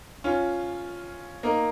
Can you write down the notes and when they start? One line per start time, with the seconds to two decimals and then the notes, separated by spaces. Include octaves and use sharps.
0.24 C#4 F4
1.43 A#3 D#4